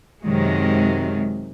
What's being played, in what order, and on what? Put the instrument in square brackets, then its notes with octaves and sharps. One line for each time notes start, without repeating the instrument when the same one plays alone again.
[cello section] F#2 C3 D#3 F#3 G#3